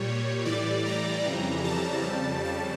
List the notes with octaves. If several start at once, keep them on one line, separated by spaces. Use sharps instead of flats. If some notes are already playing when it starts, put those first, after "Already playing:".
Already playing: A#2 G3 C#5
A2 E3 G3 D5
A#5
F2 C#3 E3 G3
A5
F2 C#3 G3
A5